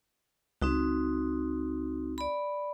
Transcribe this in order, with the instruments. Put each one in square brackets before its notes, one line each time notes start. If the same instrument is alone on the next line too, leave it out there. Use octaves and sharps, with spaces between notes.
[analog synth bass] C#2 [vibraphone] C4 D#4 F#4
[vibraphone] D5 B5